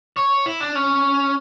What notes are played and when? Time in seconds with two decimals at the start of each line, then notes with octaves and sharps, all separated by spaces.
0.17 C#5
0.46 E4
0.61 D4
0.75 C#4